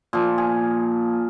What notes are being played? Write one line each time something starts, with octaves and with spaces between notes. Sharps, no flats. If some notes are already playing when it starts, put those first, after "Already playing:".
A#2 F3 F4
G#4